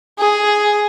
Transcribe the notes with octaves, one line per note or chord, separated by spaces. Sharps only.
G#4